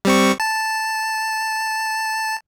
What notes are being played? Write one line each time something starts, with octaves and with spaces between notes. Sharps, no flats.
G3 C4 C#6
A5